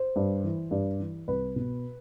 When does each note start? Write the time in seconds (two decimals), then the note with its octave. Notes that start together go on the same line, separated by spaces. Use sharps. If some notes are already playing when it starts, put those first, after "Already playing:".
Already playing: C5
0.16 G2
0.44 E3
0.71 G2
1.00 E3
1.28 C2 B4
1.56 B2